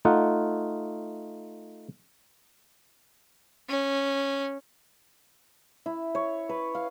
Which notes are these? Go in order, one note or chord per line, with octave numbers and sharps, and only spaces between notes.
A3 D#4 F4 F#5
C#4
E4
C#5
B4
F5